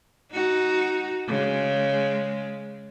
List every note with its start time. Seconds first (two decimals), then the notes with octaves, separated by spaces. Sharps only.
0.32 D#4 F#4
1.27 C#3 G#3